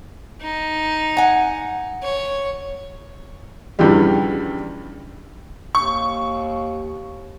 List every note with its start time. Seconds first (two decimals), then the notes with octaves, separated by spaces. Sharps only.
0.42 D#4
1.17 F#5 G#5
2.02 C#5
3.79 E2 G2 C#3 E3 F3 G3
5.75 D#2 C#6